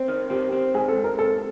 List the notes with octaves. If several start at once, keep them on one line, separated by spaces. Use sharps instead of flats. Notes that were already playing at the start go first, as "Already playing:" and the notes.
Already playing: C4
D#3
C4 G4
C4
G#2 G#4
A4
G#2
A#4
C3 A4